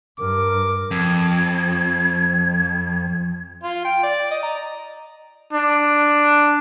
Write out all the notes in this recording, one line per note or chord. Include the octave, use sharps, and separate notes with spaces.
G2 A#4 D6
F2 G#6
F4
G5
D5
D#5
A#5
D4